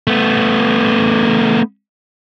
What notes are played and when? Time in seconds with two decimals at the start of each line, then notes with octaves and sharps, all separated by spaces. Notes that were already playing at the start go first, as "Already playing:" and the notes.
0.07 A3 B3